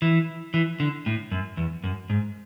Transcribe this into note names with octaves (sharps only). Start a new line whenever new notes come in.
E3
E3
D3
A2
F#2
E2
F#2
G#2